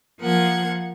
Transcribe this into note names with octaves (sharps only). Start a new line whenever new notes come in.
F3 A#3 F#5 G#6